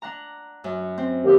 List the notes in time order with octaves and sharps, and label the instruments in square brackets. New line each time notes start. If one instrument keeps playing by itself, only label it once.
[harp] D4 F#5 A#5
F#2
C4
[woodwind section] D#2 G4